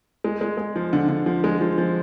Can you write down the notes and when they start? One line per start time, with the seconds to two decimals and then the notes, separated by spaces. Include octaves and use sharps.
0.24 G#3
0.41 G#3
0.58 G#3
0.76 F3
0.93 D3
1.09 D3
1.26 F3
1.44 G#3
1.61 F3
1.78 F3